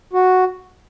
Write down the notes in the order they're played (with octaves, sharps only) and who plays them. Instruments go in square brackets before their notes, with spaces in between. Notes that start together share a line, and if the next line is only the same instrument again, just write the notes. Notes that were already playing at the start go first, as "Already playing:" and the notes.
[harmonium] F#4